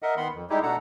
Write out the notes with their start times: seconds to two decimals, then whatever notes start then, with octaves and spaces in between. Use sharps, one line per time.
0.02 A#4 D#5 E5 F#5
0.17 D#3 B3 F#5 B5 C6
0.34 F2
0.50 G3 G#3 D#4 E4 G4 G#4
0.63 B2 A3 D4 A4 F#5 A#5